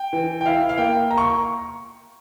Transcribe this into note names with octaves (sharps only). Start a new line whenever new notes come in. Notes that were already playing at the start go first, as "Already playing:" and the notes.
Already playing: G5
E3
G5
E4 F5
F5
A#3 G5
A#5
C#6